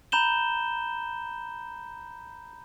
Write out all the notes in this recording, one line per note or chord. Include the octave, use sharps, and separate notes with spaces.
A#5 B5 G6 E7 G7